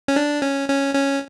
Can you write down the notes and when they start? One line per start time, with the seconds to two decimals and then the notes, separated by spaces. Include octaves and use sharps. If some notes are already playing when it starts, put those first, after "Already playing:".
0.08 C#4
0.16 D4
0.42 C#4
0.69 C#4
0.95 C#4